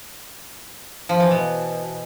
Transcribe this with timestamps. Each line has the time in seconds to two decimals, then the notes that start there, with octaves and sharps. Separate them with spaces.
1.09 F3
1.20 E3
1.31 B2